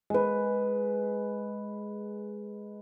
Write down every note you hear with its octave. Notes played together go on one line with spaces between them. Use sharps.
G#3 B4